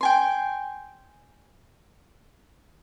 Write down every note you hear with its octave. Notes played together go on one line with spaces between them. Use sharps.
G5 G#5 C6